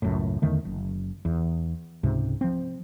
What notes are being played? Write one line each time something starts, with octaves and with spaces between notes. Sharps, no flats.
C#2 F#2 A2
E2 D3 D#3 A3
F#1
E2
C#2 G#2 C3
F3 C4